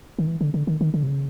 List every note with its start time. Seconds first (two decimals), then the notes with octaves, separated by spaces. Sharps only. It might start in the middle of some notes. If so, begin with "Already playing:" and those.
0.19 D#3
0.27 E3
0.41 D3
0.54 D3
0.67 D#3
0.81 D#3
0.94 D3
1.03 C3
1.07 C#3